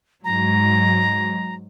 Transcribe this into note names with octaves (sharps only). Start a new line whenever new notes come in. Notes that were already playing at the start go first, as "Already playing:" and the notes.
G#2 F#3 A#5